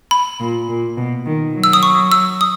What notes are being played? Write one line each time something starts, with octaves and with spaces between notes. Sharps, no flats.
B5
A#2
A#2
B2
D#3
F#3
E6
D#6
C#6
E6
D#6